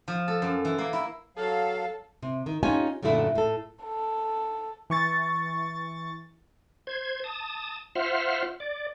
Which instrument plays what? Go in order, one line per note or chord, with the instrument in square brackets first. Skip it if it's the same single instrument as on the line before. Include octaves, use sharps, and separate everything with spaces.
[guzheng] F3
A4
F#2
E3
A#3
E4
[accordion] F#3 F5 [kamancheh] A4
[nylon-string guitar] C3
D#3
C#4 D#4 F4 G4 G#5
F#2 A#2 D3 A3 E4
A2 A4
[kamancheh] A4
[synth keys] E3 C#6 A6
[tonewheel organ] C5 G#6
A5 D#6
F4 C5 E5 F#5 F6
D5